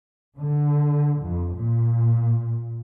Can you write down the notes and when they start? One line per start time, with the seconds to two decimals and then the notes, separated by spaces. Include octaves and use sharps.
0.38 D3
1.20 F2
1.57 A#2